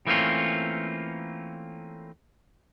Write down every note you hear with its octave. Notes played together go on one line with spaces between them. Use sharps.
E3 A3 A#3 C4 C#4 F4